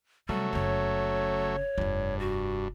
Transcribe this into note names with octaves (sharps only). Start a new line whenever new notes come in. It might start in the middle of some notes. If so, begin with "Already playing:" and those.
C3 F#3 G3 A3
F#1 C#3 C#5
F1 G2 F4
F#4